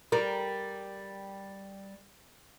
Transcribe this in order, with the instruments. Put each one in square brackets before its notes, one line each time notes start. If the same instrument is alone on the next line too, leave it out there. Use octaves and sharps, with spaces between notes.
[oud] G3 A#4